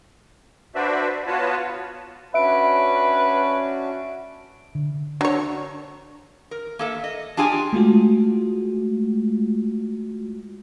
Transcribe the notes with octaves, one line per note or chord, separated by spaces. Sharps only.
D4 F#4 B4 C5 D5 E5
B3 F4 F#4 B4 C#5 A5
C#4 D4 F#4 B4 E5 D7
D3
F#3 D4 C#5
A#4
A#3 A4 E5
D#5
D4 F4 G4 G#4 G#5
G#3 A3 F4 F#4